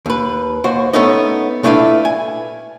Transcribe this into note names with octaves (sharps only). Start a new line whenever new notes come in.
D#2 B4
D#2 F#4 C5
A3 B3 C#4 D#4 D#5
A#2 A3 D4 E4 B4 F5
G#5